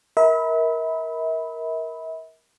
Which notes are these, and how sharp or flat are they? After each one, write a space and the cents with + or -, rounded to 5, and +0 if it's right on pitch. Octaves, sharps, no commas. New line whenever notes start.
A#4 +15 E5 -40 B5 +0